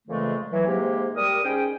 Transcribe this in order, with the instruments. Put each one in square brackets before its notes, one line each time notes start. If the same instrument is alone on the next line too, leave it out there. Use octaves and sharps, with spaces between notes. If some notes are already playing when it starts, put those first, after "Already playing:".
[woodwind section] F2 A#2 C#3 E3 G#3 A3
E3 F#3
G#2 C3 G#3 A#3 G4
G3 A#4 D#6
G#2 G3 C#4 G#4 G5